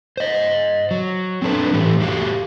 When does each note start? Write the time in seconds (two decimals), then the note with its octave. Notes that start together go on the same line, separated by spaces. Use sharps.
0.17 C5 D#5
0.91 F#3
1.42 C4 D4 A4 B4
1.73 A2 E3 A3 G4
2.00 A3 F#4 G4 F5